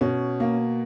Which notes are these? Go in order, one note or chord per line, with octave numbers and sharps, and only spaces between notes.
B2 C#4
A#3